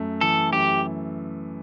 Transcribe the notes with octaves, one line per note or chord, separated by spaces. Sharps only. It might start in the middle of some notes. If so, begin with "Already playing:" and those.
Already playing: F#2 A3
E3 A4
F#2 G4